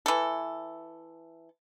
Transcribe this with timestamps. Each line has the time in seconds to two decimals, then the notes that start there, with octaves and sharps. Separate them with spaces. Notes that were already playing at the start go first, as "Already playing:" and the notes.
0.06 E3 A4